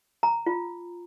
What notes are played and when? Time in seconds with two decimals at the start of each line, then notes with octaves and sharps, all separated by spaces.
0.23 A#5
0.46 F4